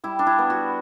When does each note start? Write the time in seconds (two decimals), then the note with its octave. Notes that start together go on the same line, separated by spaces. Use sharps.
0.04 G3 E4
0.19 D4
0.27 E4
0.38 B3
0.50 F#4